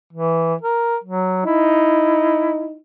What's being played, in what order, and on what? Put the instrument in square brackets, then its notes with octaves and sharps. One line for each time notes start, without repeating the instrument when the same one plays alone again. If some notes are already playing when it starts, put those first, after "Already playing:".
[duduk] E3
A#4
F#3
[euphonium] D#4 [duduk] E4